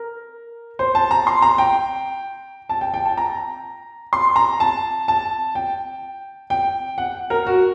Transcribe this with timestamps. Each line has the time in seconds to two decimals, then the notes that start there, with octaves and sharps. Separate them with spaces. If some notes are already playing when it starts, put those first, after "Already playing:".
Already playing: A#4
0.79 C5
0.95 A5
1.11 A#5
1.27 C6
1.42 A#5
1.58 G5
2.69 A5
2.81 G5
2.94 G5
3.05 A5
3.17 A#5
4.13 C6
4.36 A#5
4.60 A5
5.08 A5
5.55 G5
6.50 G5
6.98 F#5
7.30 A#4
7.46 F#4